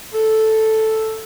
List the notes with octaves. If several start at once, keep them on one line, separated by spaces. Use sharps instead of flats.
A4